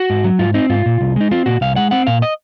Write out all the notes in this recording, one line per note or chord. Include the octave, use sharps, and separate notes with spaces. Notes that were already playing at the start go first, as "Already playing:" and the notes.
Already playing: F#4
G#2
F#3
G#2 F4
C4 D#4
G#2 F4
A#2
C2
G#3 D#4
C4 F4
A#2 F#4
C2 F5
G#3 F#5
C4 F#5
A#2 F5
D#5